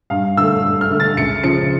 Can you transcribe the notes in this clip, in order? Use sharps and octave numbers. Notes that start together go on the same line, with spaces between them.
G2 F5
D3 A3 E6
G2
F6
D3 A3
A6
C#2 C#7
C#3 F3 C#7